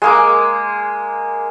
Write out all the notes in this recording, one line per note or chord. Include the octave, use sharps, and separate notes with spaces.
G#3 A#3 D6